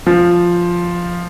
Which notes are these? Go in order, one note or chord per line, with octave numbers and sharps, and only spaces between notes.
F3